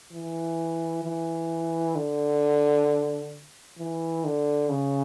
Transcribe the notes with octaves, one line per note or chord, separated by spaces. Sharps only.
E3
E3
D3
E3
D3
C#3